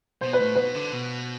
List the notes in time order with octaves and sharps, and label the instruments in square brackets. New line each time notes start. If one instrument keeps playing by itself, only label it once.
[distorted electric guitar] B2 [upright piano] C5
[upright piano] B4
[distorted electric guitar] A2
[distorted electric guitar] B2 [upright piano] B4
[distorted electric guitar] D3
B2